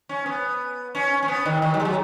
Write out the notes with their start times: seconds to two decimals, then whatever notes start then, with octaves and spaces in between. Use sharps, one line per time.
0.09 C#4
0.26 B3
0.95 C#4
1.23 C#4
1.28 B3
1.45 D#3
1.62 D#3
1.74 F#3
1.80 G#3
1.85 F#3